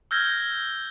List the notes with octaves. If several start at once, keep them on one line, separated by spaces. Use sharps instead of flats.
E6 F6 G6 G#6 A#6 G7